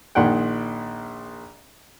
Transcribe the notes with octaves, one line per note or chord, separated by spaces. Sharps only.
A#1 A#2 D#3 F#5 G5